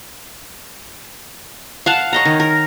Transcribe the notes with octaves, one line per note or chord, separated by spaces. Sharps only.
F5 F#5 A5
C#5 D#5 A#5
D#3
A#4